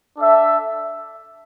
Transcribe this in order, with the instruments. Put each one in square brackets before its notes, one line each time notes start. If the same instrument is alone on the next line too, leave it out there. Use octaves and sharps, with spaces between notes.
[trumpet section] D4 A4 E5